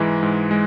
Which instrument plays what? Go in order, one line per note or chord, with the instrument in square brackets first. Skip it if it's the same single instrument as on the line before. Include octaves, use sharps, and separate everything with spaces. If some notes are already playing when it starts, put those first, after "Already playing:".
Already playing: [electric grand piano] G#2 E3 G#3
G#2
G#3